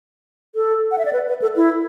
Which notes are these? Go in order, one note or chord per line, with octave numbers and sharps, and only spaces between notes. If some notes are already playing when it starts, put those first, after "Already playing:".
A4
F#5
E5
D5
B4
B4
A4
E4